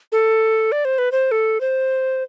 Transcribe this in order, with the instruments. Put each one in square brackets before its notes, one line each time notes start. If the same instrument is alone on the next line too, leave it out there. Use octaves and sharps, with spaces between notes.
[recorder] A4
D5
C5
B4
C5
A4
C5